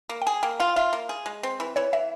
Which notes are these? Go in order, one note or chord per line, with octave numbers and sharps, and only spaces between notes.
A#3
G5
G#4 G#5
A#3 G5
F4 F5
F4 E5
A#3
G#4
G#3
C4
E3
E3 C#5
E3 E5